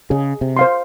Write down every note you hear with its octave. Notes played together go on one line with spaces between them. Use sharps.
C#3 G#4
C3
C5 F5 C6